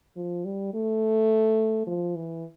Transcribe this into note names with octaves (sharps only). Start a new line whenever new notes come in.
F3
G3
A3
F3
E3